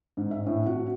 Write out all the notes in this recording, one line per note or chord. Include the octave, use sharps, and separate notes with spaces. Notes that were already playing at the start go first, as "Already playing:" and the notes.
G#2
E5
A2
F#4